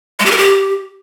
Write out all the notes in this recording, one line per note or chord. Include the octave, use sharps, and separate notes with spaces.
G#3
G4
A#4
G4